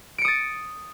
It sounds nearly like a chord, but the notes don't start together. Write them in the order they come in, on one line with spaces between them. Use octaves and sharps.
D7 C#7 D#6 A6